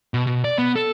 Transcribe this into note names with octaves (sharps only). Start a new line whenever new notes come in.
B2
B2
D5
B3
A4